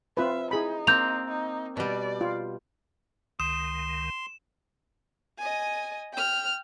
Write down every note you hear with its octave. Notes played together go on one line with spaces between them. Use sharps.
C4 F4 B4 E5
D#4 E4 G#4 B5
A#3 C4 G6 F7
D#4
B2 G3 D5
F4
C#2 D#3 C6 D#6 E7
D#5 G#5
G5 F6